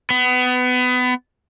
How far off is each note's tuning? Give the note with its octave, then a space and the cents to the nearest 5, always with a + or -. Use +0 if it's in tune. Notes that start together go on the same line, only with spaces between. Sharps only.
B3 +25